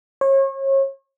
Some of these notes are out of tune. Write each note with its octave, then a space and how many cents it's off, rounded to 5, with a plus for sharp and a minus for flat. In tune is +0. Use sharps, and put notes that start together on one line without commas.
C#5 -35